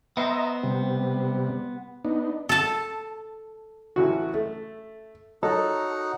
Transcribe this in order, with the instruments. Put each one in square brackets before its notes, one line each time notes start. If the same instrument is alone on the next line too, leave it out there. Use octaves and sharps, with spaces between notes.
[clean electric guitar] B3 C5 [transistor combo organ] D#5 E5 A#5
[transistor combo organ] C3 G3
B3 D4 D#4
[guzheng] A4 A5
[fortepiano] A1 E3 F#4
A3
[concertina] D#4 F#4 [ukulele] A4 [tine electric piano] C#5 D#5 A#5